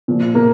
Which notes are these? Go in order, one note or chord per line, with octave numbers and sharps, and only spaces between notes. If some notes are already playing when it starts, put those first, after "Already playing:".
A#2 F3
A#3 A#4